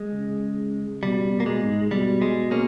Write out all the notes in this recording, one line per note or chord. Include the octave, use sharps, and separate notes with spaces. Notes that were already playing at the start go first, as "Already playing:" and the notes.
Already playing: G#3
C#3
B2 G3
B2
A#3
G#3
G#2
B2 G3
G#3
A#3 C#4